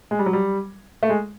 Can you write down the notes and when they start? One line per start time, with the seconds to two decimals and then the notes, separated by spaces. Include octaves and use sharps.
0.11 G#3
0.19 G3
0.26 F#3
0.33 G3
1.03 A3
1.09 G#3